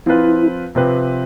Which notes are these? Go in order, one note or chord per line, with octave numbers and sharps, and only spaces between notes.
F3 C4 E4 F4 B4
C3 F3 C4 G4 B4